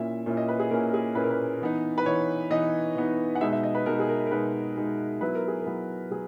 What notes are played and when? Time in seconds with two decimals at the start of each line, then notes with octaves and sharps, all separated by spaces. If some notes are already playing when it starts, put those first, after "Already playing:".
Already playing: A#2 A#3 C#4 E4 E5
0.26 A#2 A#3 C#4 E4
0.37 D#5
0.49 B4
0.59 G#4
0.71 A#2 A#3 C#4 E4 A#4
0.94 G#4
1.15 A#2 A#3 C#4 E4 B4
1.23 A#4
1.31 B4
1.61 E3 B3 D#4
1.98 B4
2.06 E3 B3 D#4 C#5
2.51 E3 B3 D#4 D#5
2.95 E3 B3 D#4
3.35 F#5
3.41 B2 G#3 D#4 E5
3.53 E5
3.63 D#5
3.75 B4
3.86 B2 G#3 D#4 A#4
4.00 G#4
4.09 A#4
4.27 A#4
4.31 B2 G#3 D#4 B4
4.77 B2 G#3 D#4
5.21 F#3 B3 E4 B4
5.35 A#4
5.48 G#4
5.61 A#4
5.66 F#3 B3 E4
6.11 F#3 G#4